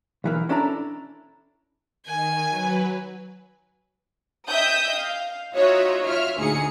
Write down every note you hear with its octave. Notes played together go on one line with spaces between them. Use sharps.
B1 E3 A#3
C#4 D4 E4 A4 D5 A#5
D#3 G#5
F#3 B4
D#5 E5 G5 D#6 G6
F5
D#4 F4 F#4 C#5 D#5 E5
F4 C#5 E5 F6
D2 A#2 D#4 G#4 C#7